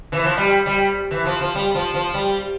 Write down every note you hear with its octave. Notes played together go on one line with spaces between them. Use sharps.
E3
F3
G3
G3
E3
F3
F3
G3
F3
F3
G3